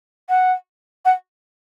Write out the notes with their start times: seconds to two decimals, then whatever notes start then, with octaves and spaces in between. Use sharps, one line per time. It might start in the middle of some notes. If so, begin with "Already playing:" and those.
0.29 F#5
1.05 F#5